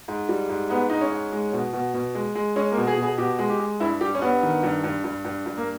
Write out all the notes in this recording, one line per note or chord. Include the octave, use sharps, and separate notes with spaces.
G#2
G3
G#2
G#2 B3
G#2 D#4
C#4
G#2
G#3
B2
B2
B2
G#3
G#3
G#3 C#4
A#3
B2
G#4
B2
G#4
B2 G4
G#3
G4
G#3
G2 E4
G3 G4
C#4
G2 B3
D#3
G2
G2
G2
G2
G2
A#3